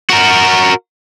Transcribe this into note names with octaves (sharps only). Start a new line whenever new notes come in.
F#4 A#4